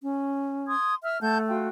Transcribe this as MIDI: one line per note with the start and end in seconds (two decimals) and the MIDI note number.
0.03 0.74 61
0.67 0.93 84
0.67 0.93 87
0.67 0.93 92
1.03 1.20 76
1.03 1.19 88
1.03 1.19 89
1.21 1.68 57
1.21 1.39 78
1.21 1.39 81
1.21 1.39 91
1.48 1.69 65
1.48 1.69 66
1.48 1.69 79